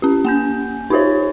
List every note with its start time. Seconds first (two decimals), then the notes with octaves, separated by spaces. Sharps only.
0.02 C#4 G4
0.25 A#3 G#5 G6
0.90 D#4 F4 G4 C5 C#5